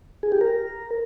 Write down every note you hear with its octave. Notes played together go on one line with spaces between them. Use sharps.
G#4
G4
A#4